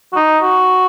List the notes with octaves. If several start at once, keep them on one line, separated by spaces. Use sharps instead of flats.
F#4
D#4
F#4